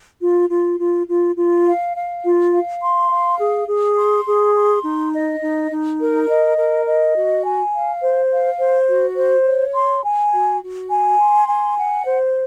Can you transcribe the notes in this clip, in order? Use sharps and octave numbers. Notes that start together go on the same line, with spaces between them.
F4
F4
F4
F4
F4
F5
F5
F4
F5
C6
F5
G#4
G#4
C6
G#4
C6
D#4
D#5
D#4
D#4
A#4
D#5
A#4
D#5
F#4
G#5
F5
C5
F5
C5
F#4
C5
C#5
C6
G#5
F#4
F#4
G#5
C6
G#5
F#5
C5